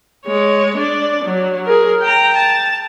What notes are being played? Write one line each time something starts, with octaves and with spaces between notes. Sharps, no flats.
G#3 C#5
D4 D5
F#3
G#4 A#4
G5 A#5
A5